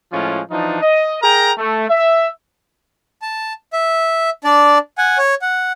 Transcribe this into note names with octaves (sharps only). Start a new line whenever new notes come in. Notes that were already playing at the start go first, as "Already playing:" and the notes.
A2 F3 G#3 C#4 F4
E3 F3 D4 D#4
D#5
G#4 A#4 G5 A#5
A3
E5
A5
E5
D4 D5
F#5 G#5
C#5
F#5